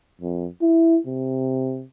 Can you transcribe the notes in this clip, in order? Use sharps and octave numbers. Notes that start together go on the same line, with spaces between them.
F2
E4
C3